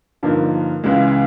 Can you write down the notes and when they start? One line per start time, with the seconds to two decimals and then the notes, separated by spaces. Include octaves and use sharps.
0.23 G2 D3 F3 A#3 D#4
0.84 C#2 C#3 E3 G#3